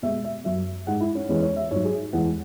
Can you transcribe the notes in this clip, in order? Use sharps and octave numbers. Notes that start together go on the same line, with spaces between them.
B2 G#3 E5
E5
F#2 F#3 E5
G#2 G#3 F#5
E4
C#4
E2 E3 G#3 C#4
C#5
E5
G#2 F#3 C#5
G#4
E2 E3 G#3 F#5